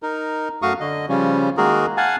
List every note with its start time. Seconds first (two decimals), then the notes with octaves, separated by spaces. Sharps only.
0.03 D#4 A#4
0.62 F#2 A3 F#4 F5 C#6 D#6
0.80 D3 D#5
1.09 C#3 F3 G3 C#4
1.57 D#3 G#3 A#3 F#4 G#4 A#4
1.97 F5 F#5 G#5 A5